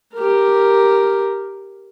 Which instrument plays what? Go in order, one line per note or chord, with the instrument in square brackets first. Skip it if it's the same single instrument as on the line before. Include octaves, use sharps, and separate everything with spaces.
[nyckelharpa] G4 A#4